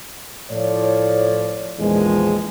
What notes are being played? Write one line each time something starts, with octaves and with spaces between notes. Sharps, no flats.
A2 F3 C#5 D5
A#1 E2 D#3 F3 G#3